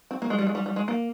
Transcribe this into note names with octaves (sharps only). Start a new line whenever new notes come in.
C4
A#3
G#3
G3
G#3
G3
G3
G#3
A#3